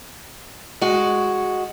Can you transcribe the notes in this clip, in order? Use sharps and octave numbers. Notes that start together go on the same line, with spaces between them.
G#3 F#4